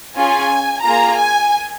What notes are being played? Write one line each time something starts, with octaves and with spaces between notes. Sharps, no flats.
C#4 F4 G#4 G#5
A#3 F4 G#4 A#5
G#5